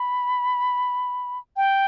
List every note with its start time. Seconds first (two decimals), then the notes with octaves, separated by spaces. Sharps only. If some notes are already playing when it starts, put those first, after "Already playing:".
Already playing: B5
1.57 G5